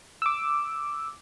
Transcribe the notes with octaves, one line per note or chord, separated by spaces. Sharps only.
D6 E6